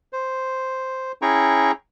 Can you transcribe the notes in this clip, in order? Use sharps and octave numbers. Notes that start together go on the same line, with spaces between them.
C5
C#4 E4 G#4 G5 A#5 C#6